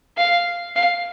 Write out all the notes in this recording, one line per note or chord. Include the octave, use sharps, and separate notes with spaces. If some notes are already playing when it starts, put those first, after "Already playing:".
F5
F5